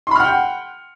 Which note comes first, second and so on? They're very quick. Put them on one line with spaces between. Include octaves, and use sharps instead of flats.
C6 B5 F6 F#5 G5